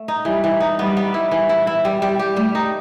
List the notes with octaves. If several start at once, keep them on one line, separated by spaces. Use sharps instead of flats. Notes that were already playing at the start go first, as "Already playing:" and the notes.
Already playing: A3
D#4
E3 G3
E3
D#4
G3 B3
B3
E4
E3
E4
E4
G3
G3
G4
G3 A3
D#4